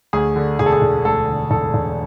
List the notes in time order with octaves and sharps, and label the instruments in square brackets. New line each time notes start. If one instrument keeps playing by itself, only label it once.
[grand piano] D2 G#4
D3
E1 G#4
A4
G#4
E1
D2 A4
D3
E1 A4
E1